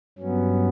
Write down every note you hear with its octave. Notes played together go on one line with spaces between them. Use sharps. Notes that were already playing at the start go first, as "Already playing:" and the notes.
G2 F#3 B3 C#4